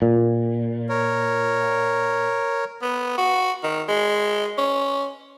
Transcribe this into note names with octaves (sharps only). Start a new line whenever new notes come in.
A#2
A#4 C#5
B3
F#4
D#3
G#3
C#4